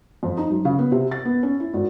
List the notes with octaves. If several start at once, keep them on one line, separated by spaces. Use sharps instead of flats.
F2
D#4
F#2
C#3
B3
C3
A6
B3
C#4
E4
G#1